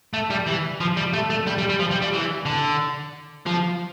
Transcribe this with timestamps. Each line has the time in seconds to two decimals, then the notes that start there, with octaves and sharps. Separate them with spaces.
0.14 A3
0.30 G3
0.46 E3
0.80 F3
0.97 G3
1.13 A3
1.30 A3
1.47 G3
1.58 G3
1.69 G3
1.79 F3
1.91 G3
2.02 G3
2.14 E3
2.46 D3
3.46 F3